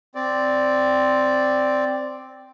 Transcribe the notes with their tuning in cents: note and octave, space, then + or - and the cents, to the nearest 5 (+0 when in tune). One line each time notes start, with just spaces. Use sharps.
C4 +0 D5 +0